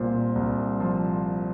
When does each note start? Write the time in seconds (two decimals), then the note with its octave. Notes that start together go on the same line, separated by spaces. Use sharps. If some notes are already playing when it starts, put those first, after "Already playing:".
Already playing: C2 A#2 C5
0.35 C2
0.80 F3